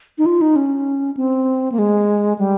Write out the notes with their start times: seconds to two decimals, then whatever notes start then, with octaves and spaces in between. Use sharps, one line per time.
0.18 D#4
0.26 F4
0.41 D#4
0.56 C#4
1.17 C4
1.72 A#3
1.79 G#3
2.39 G3